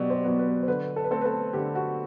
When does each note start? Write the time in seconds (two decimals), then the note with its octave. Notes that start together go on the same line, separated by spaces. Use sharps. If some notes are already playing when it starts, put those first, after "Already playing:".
Already playing: B2 F#3 B3 G4 D5
0.10 C5
0.24 F#3 B3
0.39 B4
0.63 C5
0.68 D3 B4
0.96 A4
1.04 B4
1.11 A3 C4 A4
1.21 B4
1.25 A4
1.53 D3 G4
1.75 F#4